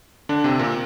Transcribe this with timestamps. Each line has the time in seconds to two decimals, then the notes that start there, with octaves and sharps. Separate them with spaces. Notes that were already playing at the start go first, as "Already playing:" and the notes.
0.29 D3 D4
0.44 C3 C4
0.59 A#2 A#3